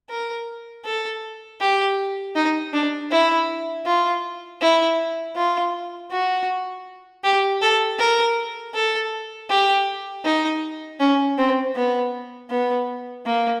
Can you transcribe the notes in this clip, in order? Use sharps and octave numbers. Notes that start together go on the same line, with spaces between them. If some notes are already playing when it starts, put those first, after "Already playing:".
A#4
A4
G4
D#4
D4
E4
F4
E4
F4
F#4
G4
A4
A#4
A4
G4
D#4
C#4
C4
B3
B3
A#3